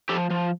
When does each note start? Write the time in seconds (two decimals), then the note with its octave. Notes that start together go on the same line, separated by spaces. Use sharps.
0.09 F3 G4 A4
0.30 F3